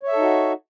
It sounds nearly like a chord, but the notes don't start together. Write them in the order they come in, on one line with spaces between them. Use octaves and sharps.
C#5 E5 A4 D#4 F#4